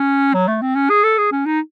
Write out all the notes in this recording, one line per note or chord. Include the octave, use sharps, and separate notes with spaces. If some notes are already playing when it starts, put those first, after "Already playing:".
Already playing: C#4
F#3
A3
C4
C#4
G#4
A4
G#4
C#4
D#4